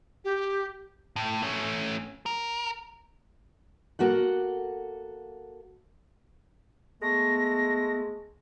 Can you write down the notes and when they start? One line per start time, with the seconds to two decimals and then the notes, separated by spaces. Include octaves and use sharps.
0.24 G4
1.16 A2
1.42 A3 C#4
2.26 A#4
3.99 A#3 F#4 A4 F#5
7.02 G#3 A3 B3 A#6